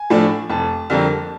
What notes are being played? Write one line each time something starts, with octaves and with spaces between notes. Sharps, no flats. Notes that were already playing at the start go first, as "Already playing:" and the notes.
Already playing: G#5
A2 F3 A3 D4
F1 A5
F2 D3 G3 A#3